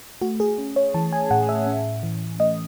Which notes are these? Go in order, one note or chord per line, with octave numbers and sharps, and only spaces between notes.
A3 F#4
G#4
C#4
C#5
E3 A5
G#5
A2 F#5
E5
C#4
E3
A3 D#5